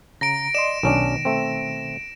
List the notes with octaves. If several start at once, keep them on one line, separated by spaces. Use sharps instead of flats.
C#3 A#5 A#6 D7
D5 D#5 C6 E7
B1 B2 D#3 C#4 D4
A3 C4